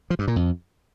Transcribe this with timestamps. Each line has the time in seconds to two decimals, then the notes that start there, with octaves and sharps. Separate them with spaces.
0.10 F3
0.19 G2
0.27 A#2
0.36 F2